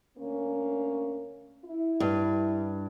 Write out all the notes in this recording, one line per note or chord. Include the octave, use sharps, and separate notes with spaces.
D2 A#3 C#4
E4
G2